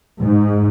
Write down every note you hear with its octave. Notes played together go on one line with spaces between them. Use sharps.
G#2